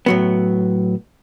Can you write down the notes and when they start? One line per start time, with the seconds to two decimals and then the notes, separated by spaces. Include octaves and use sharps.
0.06 A2 F#3 B3